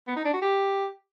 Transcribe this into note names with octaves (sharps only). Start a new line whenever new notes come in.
B3
D#4
D4
F#4
G4